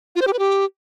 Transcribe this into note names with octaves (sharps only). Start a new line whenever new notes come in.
F4
C5
G4
B4
G4